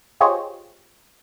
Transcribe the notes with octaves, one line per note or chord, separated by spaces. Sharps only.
F4 G4 G#4 C5 C#5 D#5